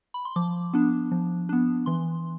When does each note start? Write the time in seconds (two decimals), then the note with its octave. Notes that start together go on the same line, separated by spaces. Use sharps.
0.14 B5
0.25 C6
0.36 F3 D6
0.73 B3 D4
1.11 F3
1.49 B3 D4
1.86 E3 C6